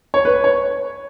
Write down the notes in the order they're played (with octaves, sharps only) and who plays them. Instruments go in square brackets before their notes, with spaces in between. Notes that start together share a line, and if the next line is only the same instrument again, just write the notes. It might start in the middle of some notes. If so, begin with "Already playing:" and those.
[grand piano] C#5
B4
C#5